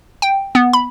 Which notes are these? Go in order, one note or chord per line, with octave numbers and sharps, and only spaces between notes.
G5
B3
B5